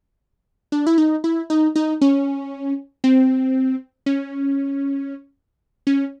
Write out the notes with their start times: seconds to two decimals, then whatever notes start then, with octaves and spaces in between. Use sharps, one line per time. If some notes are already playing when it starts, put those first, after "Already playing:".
0.72 D4
0.87 E4
0.98 D#4
1.24 E4
1.50 D#4
1.76 D#4
2.01 C#4
3.04 C4
4.06 C#4
5.87 C#4